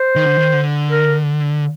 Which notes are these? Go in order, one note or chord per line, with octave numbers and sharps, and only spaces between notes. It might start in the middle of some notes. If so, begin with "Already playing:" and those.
Already playing: C5
D#3
D3
D#3
D3
A#4